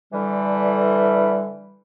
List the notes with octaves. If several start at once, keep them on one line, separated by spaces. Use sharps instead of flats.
D3 E3 G3